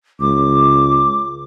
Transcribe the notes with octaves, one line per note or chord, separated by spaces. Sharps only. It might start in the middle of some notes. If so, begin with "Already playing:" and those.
C#2 D6